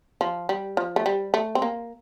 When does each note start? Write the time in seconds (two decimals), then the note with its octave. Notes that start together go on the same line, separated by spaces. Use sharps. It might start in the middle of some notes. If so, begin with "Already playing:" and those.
0.21 F3
0.49 G3
0.77 F3
0.96 A3
1.06 G3
1.34 A3
1.55 C4
1.62 A#3